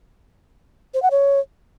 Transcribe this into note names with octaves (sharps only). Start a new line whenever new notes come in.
C5
F#5
C#5